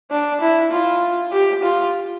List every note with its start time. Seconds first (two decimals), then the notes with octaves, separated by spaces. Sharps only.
0.11 D4
0.41 E4
0.71 F4
1.32 G4
1.62 F4